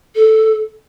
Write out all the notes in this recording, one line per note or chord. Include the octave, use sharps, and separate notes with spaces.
A4